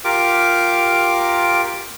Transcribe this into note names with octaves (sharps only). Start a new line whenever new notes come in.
F4 G4 A#4 D6